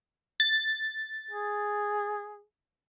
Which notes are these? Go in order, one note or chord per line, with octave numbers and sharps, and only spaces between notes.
A6
G#4